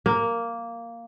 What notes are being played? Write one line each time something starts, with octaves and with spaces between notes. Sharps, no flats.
A#3